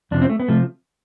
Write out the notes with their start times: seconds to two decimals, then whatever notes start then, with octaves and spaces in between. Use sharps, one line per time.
0.11 F2 C3 F3 D4
0.22 C4
0.30 A3
0.40 B3
0.48 C3 F3 A3